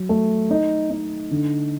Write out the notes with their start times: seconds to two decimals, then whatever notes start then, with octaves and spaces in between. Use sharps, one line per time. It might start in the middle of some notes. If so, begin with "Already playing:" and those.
Already playing: F#3
0.09 A3
0.51 D#4
0.90 D#4
1.31 D3